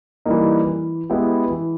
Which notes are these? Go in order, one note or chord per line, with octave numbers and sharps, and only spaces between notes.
E3 G3 A#3 D#4
E3
G#3 B3 E4 G4
E3